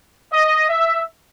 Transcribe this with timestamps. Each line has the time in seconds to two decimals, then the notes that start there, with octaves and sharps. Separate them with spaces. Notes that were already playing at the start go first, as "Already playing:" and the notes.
0.32 D#5
0.68 E5